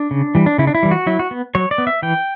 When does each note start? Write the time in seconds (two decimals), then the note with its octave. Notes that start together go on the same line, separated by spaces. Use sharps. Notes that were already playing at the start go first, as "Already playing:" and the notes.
Already playing: D4
0.11 C#3
0.35 E3 G3
0.46 D4
0.58 C#3 E4
0.67 D4
0.75 E4
0.83 E3 G3
0.91 F#4
1.07 F#3 E4
1.19 F#4
1.31 B3
1.55 F#3 C#5
1.71 D5
1.78 B3
1.87 E5
2.02 E3 G5